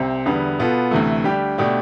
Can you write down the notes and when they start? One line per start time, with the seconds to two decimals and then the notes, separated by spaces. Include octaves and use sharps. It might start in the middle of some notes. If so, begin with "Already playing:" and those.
Already playing: C2 C3 C4
0.26 E2 D3 G3 B3
0.59 B2 B3 F4 A4
0.91 D2 C3 E3 A3
1.24 D2 D3 G3 D4 G4
1.58 B2 A3 D4 G4